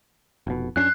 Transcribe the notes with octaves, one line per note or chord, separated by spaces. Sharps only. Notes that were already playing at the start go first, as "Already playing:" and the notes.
F1 B2
F2 C#4 D4 F#6 C7